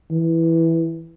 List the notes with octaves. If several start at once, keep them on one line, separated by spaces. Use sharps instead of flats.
E3